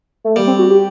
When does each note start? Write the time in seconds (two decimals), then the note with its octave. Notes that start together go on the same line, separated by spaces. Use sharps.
0.24 A3
0.36 G3 A#3
0.47 C4
0.59 F#4
0.70 G4